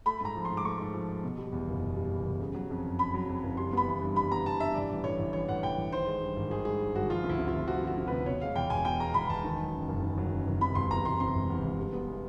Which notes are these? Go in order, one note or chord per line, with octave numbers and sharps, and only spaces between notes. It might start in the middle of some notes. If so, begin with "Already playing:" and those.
A3 B5
G#2 A#5
F3
C6
G#2
D6
A3 C#6
G#2
F3
G#2
B2
G3
E2
F#1
B2
G3
E2
F#1
C#3
F#3
F2
F#1
C#3 B5
F#3
F2
F#1
G3 C6
B3 B5
E3
G2
G3 B5
B3 A#5
E3 A5
G2 E5
E3 D5
A1
A2 C#5
A1
E3 C#5
A1 F#5
A2 G5
A1
D#3 C5
G#3
G2
G#1
D#3 G#4
G#3 G#4
G2
G#1 F#4
F3 F4
D2
E4
C3
F4
D2
F3 F#4
D2 F#4
C3
D2 B4
B2 C#5
G#3 F5
E2 G5
E1 G#5
B2 G5
G#3 A#5
E2 B5
E1 A5
D#3
F#3
F#2
F#1
D#3
F#3
F#2
F#1
C3 B5
E1 C6
E2 A#5
E1 C6
C3 C6
E1
E2
E1
G3
B3
E3